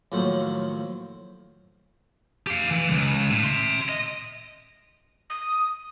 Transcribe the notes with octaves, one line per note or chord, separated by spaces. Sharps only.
D#2 A2 F3 F#3 C5
G4 F5
E3
C#2
A2
E5 C6
D#5
D#6